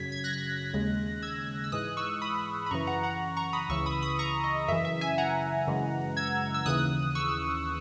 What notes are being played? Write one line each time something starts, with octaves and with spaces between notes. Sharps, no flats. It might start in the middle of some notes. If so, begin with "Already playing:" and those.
Already playing: F#2 C#3 F#3 G#6 B6
G#6
F#6 A#6
D#2 C#3 G#3
E6 G#6
E6
G#2 E3 G#3 D#6 F#6
C#6 E6
B5 D#6
B5
F#2 C#3 E3 A#5 C#6
F#5 A#5
F#5 A#5
A#5 C#6
B5 D#6
C#2 C#3 E3 C#6 E6
B5 D#6
B5 D#6
A#5 C#6
D#5
F#2 C#3 E3 E5
E5
E5 G#5
F#5 A#5
F#2 C#3 E3 G#3
E6 G#6
E6
D#2 C#3 E3 D#6 F#6
C#6 E6